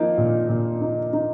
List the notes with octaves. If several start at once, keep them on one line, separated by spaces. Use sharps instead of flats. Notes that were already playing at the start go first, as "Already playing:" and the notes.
Already playing: F3 A#3 D#4
A#2
A#2
D#4
D#4